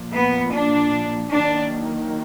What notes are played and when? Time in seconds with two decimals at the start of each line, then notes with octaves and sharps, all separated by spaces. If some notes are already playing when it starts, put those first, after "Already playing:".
Already playing: A#2 F3 A#3
0.13 B3
0.52 D4
1.30 D#3 F#3 A#3 D4